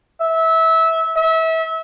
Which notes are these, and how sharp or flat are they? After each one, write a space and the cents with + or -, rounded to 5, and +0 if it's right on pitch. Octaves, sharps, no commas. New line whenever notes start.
E5 -20
E5 -30